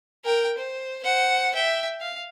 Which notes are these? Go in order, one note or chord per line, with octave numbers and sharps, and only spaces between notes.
A#4 G5
C5
C5 F#5
E5 G5
F5